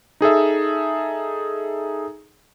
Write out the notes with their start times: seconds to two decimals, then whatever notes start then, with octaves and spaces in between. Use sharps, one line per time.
0.21 D#4 G#4 A4 E5